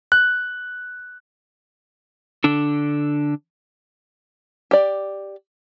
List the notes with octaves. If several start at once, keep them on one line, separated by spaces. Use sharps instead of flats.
F#6
D3 D4 A4
G4 D5